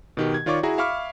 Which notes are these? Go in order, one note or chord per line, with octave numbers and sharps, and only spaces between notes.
B2 D#3 G4
G#6
D#3 F4 C#5 D5 C#6 D6
E4 F#4 G#4 A#5
E5 F5 B5 C#6 D6 F6